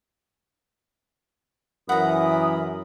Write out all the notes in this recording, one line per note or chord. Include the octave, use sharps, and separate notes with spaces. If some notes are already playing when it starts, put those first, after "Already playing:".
F#2 E3 A#4 F#5 A#5 B5 D#6